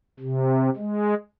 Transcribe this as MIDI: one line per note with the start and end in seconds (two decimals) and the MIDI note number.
0.20 0.70 48
0.76 1.14 56